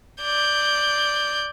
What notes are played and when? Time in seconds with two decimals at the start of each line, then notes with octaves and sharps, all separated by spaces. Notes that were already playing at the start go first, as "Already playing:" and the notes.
0.22 D5 G6